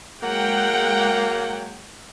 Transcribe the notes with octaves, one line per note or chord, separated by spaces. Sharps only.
F#3 G#3 A#3 F#5 G5